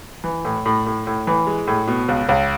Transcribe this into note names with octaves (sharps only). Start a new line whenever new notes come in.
E3
A2
A2
A2
A2
E3
G#3
A2
B2
C#2
C#2